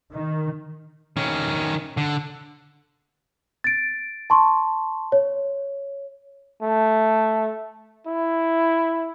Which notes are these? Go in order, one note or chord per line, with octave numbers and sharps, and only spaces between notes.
D#3
D#3 C#4
D3
A6 D7
A5 C6 C#6
C#5
A3
E4